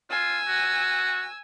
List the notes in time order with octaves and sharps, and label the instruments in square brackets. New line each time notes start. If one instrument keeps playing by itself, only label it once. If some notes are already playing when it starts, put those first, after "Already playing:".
[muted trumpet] F4 [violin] G#5 E6
[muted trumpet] F#4